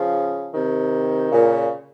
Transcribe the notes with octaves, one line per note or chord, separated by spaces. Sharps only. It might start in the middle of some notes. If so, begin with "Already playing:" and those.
Already playing: C#3 F3
C3 D#3
A#2 C#3